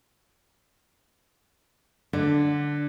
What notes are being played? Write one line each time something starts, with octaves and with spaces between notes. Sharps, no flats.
D3 D4